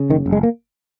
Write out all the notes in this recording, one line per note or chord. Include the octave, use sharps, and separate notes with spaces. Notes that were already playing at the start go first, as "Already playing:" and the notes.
Already playing: C#3
F#1 D#3
F#1
G#3
A#3